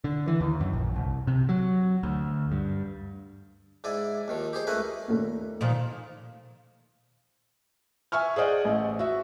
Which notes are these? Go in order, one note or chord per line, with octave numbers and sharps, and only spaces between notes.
D3
E3
D#2
F#2
A#1
C2
C3
F#3
D2
G2
G#2 E4 D5 G#5
D#2 D#3 F3
G4 G#4 C5
C#2 A3 A#4 B4 G#5 B5
D#2 A#2 A3
A#2 D#3 F3
E5 G#5 C#6 F6
G#4 C5 D5 D#5 F#5
A1
F#4 E5